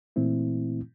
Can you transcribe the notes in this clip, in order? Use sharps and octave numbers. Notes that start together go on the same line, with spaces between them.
A#2 E3 A3 C4 E4